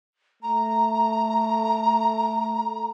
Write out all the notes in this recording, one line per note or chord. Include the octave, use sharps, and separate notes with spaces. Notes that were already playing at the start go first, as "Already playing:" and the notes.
A3 A#5